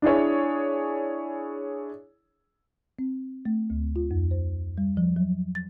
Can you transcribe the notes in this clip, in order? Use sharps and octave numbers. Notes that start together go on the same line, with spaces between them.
D4 E4 G#4 C#5
C4
A3
D2
F4
F2
C5
G3
F3
F#3
A6